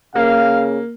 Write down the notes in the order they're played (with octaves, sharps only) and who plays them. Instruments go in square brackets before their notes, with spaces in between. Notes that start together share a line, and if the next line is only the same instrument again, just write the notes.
[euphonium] C#3 [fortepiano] A#3 [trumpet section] F5